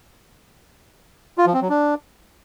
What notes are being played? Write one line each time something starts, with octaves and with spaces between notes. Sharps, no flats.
F4
F3
C4
F#3
D4